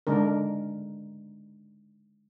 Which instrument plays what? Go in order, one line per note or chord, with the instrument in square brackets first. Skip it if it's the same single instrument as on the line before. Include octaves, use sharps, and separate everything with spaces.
[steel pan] D3 G#3 D4 A#4